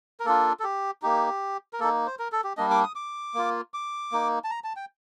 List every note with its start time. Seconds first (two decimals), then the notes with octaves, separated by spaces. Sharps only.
0.20 A#4
0.25 A#3 D4 F4 A4
0.60 A4
0.64 G4
1.02 A#3 D#4 G4
1.73 A#4
1.80 A#3 D#4 A4
2.06 C5
2.19 A#4
2.32 A4
2.44 G4
2.57 G3 A#3 D4 D#5
2.71 D6
2.83 D#6
2.95 D6
3.34 A#3 F4
3.74 D6
4.12 A#3 D#4
4.44 A5
4.51 A#5
4.64 A5
4.76 G5